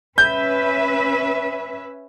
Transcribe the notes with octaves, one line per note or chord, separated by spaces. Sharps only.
C#4 B4 E5 G6